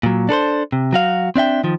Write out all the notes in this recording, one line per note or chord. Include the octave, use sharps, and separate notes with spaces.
A#2 F#3
D4 A4 B4 C5
C3
F#3 F#4 F5
C4 D4 E5 G5
D#3 F3